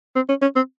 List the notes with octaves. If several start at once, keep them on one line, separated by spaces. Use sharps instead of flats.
C4
C#4
C#4
C4